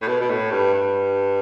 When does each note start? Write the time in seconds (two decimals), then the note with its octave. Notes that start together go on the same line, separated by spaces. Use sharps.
0.02 A2
0.08 B2
0.21 B2
0.30 A2
0.51 G2
0.73 G2